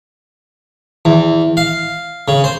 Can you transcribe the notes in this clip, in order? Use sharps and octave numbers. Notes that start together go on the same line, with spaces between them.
E2
F5
C#3
C5